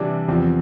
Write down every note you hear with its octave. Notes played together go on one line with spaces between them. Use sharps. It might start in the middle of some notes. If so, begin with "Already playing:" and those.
Already playing: C3 E3 G3 D4
E2 C3 F3 C4